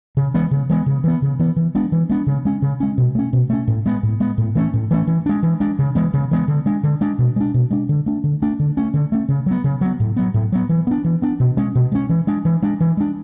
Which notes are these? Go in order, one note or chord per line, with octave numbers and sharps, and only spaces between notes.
C#3
E3 G#3 B3
C#3
E3 G#3 B3
C#3
E3 B3
C#3
E3 B3
E3
G#3 B3 D4
E3
G#3 B3 D4
C#3
G#3 C#4
C#3
G#3 C#4
B2
A3 C#4
B2
A3 C#4
A2
G#3 B3
A2
G#3 B3
A2
E3 A3 C#4
A2
E3 A3 C#4
E3
G#3 D4
E3
G#3 D4
C#3
E3 G#3 B3
C#3
E3 G#3 B3
D3
G#3 D4
D3
G#3 D4
B2
G#3 D4
B2
G#3 D4
D3
A3 D4
D3
A3 D4
D3
A3 C#4
D3
A3 C#4
C#3
F#3 B3
C#3
F#3 B3
A2
F#3 B3
A2
F#3 B3
E3
B3 D4
E3
B3 D4
B2
G#3 C#4
B2
G#3 C#4
E3
G#3 D4
E3
G#3 D4
E3
G#3 D4